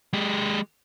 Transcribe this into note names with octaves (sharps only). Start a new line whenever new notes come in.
G#3 G4